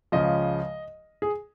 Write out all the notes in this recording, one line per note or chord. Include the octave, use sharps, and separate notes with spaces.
C#2 C#3 F3 D#5
G#4